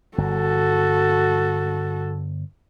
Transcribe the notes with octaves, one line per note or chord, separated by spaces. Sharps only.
G1 F#4 A4